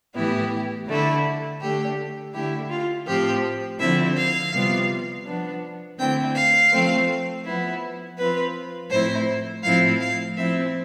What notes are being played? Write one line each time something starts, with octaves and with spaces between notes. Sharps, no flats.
A2 E3 B3 E4 G4
D3 A3 E4
D3 A3 D4 G4
D3 A3 E4 G4
F4
A2 F3 C4 G4
D3 F3 C4 E4 E5
F5
C3 G3 B3 F4
F3 B3 D4
D3 A3 C4 E4 G5
F5
F3 A3 C4
F3 B3 E4
F3 C4 F4 B4
A2 F3 A3 C4 E4 C5
A2 F3 C4 E4 F5
F5
F3 C4 E4 E5